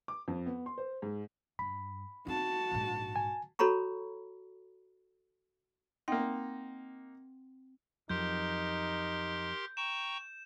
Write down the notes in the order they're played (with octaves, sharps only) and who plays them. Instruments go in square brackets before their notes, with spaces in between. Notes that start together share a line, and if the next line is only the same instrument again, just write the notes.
[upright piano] D6
F2
B3
C6
C5
G#2
[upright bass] G2 [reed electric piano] B5
[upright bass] C4 D#4 [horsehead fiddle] F#4 A5
[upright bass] A#1 G#2
[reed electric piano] G#5
[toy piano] F#4 A4 C#5 A#5 B5 C#6
[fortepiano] A#3 D#4 [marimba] C4 F#5 G5
[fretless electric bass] F2 F#3 [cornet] D#4 [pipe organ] G4 A#4 C6 [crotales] G6
[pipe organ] G5 A#5 C#6 [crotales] E7